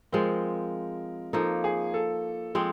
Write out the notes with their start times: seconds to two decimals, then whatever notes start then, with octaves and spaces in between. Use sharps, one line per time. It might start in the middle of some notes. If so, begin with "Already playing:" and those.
0.12 F3 G#3 C4 A#4
1.33 F3 A#3 D#4 A4
1.64 G#4
1.94 A4
2.55 F3 G#3 C4